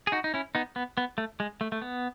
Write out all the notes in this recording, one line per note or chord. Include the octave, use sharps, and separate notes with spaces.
G#4
D#4 F#4
D#4
C#4 E4
B3 D#4
B3
B3
A3
G#3
A3
A3
B3